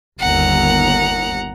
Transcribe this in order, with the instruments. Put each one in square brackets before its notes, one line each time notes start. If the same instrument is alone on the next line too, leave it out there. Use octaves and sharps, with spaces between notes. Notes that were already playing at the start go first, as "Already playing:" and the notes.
[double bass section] G1 D#2 [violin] F#5 A#5